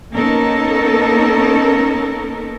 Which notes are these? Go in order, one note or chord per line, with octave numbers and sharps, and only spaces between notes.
A#3 B3 C#4 D#4 A4 A#4